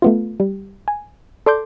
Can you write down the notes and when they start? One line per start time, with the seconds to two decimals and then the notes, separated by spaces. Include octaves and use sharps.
0.02 A3 B3 F4
0.40 G3
0.88 G#5
1.46 A4 D5 C6 D6 G6